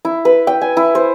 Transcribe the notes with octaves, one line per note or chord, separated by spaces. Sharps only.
E4
B4
G5
G#5
E4
C5